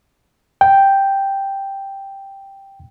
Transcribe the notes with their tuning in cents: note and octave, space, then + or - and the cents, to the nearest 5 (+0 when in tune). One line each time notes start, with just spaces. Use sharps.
G5 +0